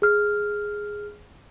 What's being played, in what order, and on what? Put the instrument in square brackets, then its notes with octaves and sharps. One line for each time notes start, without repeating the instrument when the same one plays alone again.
[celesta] G#4 F6